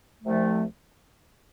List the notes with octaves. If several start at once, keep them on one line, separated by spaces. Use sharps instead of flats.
C2 C3 F3 A3